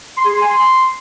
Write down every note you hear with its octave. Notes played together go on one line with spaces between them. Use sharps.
C6
G#4
C6
G#5
C6